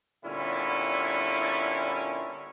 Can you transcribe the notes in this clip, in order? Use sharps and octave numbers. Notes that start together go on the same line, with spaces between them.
A#2 D3 G3 B3 C#4 E4